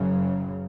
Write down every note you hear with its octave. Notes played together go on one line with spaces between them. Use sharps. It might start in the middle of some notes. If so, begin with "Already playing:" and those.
Already playing: F#1 F#2 C#3